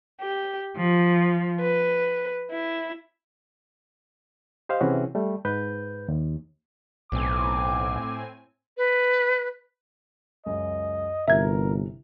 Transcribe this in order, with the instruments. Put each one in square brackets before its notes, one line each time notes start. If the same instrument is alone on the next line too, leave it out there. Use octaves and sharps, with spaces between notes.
[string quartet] G4
F3
B4
E4
[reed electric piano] G4 C5 D#5 F5
C3 E3 C4 C#4 F#4 G#4
G3 A3
G#2 B4 G6
D#2
[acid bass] B1 [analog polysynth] A2 C4 G#5 [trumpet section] D6
[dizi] B4
[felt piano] C#2 F#2 [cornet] D#5
[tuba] G1 [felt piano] C3 E3 [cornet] A#4 [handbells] E5 G#6